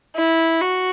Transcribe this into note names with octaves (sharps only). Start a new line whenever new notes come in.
E4
F#4